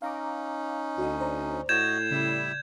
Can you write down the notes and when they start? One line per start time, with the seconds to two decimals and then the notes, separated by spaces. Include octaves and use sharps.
0.02 C#4 D#4 F5 A#5 D6
0.98 D2 F#4 C#5 D#5
1.20 C5 D5 A#5
1.69 A2 F#4 D#5 G6 G#6 E7
2.11 C#3 G3 E4 D5 E5